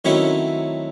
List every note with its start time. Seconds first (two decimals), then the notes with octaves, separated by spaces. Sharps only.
0.05 D#3 F#3 A3 C4 C#4 E4 C#5